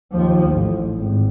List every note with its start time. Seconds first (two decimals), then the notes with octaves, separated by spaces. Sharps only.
0.12 D#2 F3
0.51 A1
0.95 G#1